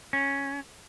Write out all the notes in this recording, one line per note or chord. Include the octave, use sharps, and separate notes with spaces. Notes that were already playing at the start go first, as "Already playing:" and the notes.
C#4